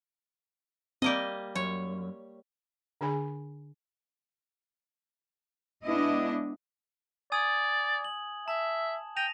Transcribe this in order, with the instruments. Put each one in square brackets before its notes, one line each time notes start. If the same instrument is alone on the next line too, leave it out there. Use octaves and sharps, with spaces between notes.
[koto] G3 A#3 D#5 [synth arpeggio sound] C4 D7
[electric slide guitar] F#2 [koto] C#5
[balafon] D3 D4 G#4 G#5 B5
[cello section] G#3 B3 D4 E4 D#5
[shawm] D5 [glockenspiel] G#5 D#6 G#6
[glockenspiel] F#7
[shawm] E5 [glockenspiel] A5
[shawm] G5 [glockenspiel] A#6 D#7 F7